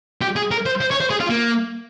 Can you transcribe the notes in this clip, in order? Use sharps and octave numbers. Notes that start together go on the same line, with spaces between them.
G4
G#4
A#4
C5
C5
C#5
C5
G#4
F4
A#3